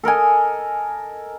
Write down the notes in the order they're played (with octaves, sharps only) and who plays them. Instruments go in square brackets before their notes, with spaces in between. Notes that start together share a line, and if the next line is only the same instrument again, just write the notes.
[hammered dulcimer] A4 A#4 D#5 G#5